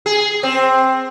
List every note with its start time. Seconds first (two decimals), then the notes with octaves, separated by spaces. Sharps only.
0.06 G#4
0.43 C4